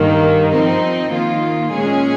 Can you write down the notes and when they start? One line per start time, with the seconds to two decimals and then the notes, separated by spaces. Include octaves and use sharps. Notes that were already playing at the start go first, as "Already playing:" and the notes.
Already playing: G2 D#3 A#3
0.52 F3 C4 D#4
1.12 D#3 A#3 F4
1.72 A#2 G#3 C#4 G#4